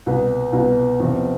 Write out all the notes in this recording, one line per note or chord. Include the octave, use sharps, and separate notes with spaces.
C2 B2 B3
C2 B2 B3
E2 C3 F3 C4